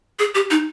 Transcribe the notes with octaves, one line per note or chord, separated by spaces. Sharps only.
G#4
G4
D#4